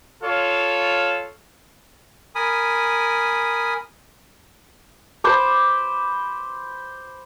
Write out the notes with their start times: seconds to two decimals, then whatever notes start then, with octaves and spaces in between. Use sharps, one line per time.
0.23 F4 A4 C#5 F5
2.35 A#4 G#5 B5 D#6
5.24 C5 B5 D6